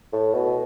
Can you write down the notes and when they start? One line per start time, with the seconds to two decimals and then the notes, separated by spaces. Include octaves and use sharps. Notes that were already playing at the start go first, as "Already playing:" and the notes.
0.13 A2
0.34 B2